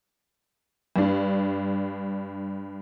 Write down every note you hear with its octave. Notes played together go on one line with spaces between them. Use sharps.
G2 D4